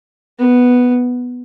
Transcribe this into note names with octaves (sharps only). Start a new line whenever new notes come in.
B3